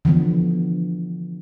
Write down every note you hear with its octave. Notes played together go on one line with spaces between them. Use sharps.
D3 E3 F3 B3